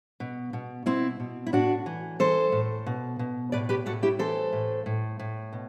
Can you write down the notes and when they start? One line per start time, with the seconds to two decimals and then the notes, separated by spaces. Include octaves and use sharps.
0.20 B2
0.53 B2
0.86 B2 C4 E4
1.20 B2
1.47 E4
1.53 A2 D4 F#4
1.86 E3
2.19 E3 A4 C5
2.52 A2
2.86 B2
3.19 B2
3.52 A2 B4 D5
3.69 G4 B4
3.86 A2 F#4 A4
4.03 E4 G4
4.19 E3 A4 C5
4.53 A2
4.86 A2
5.19 A2
5.53 B2